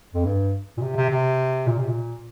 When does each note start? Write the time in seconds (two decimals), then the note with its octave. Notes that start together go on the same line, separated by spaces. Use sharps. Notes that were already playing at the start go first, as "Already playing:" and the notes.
0.14 F2
0.24 G2
0.77 A#2
0.81 C3
0.96 C3
1.10 C3
1.67 A#2
1.78 C3
1.88 A#2